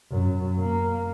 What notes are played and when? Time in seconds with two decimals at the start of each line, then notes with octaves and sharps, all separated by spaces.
0.11 F#2
0.60 A#3